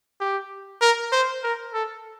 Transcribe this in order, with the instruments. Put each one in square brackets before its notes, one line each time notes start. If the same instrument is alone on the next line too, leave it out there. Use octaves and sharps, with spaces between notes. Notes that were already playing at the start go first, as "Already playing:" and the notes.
[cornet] G4
A#4
C5
A#4
A4